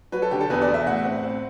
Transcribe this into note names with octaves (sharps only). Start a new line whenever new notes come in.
F#3 B4
A4
D3 G4
A4
E2 B4
D5
E2
E5
A2 F#5
C4
C4